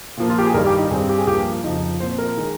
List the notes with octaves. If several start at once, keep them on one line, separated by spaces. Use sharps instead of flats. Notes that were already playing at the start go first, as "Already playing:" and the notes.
A#2 F3 A#3
F4
G4
G#4
G2 D#3 G3 A#4
G4
D#4
G2 G3 C4 G#4
G4
G#4
G2 F3 A#3 G4
F2 C#3 F3 D#4
A#2 F3 C4 C5
A#4
D#3 G#3